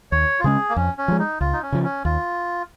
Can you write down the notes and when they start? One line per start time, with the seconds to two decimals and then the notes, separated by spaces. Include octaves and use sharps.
0.12 D#2 C#5
0.40 F4
0.44 C#3 G#3 C#4 G#4
0.69 A#3
0.76 F2 C#4
0.98 C#4
1.08 F3 G#3
1.19 D#4
1.41 C#2 F4
1.53 D#4
1.62 C#4
1.72 C#3 F3
1.84 C#4
2.05 D#2 F4